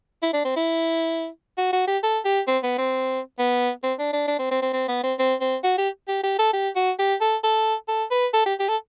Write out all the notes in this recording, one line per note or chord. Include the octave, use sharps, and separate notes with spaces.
E4
D4
C4
E4
F#4
F#4
G4
A4
G4
C4
B3
C4
B3
C4
D4
D4
D4
C4
C4
C4
C4
B3
C4
C4
C4
F#4
G4
G4
G4
A4
G4
F#4
G4
A4
A4
A4
B4
A4
G4
G4
A4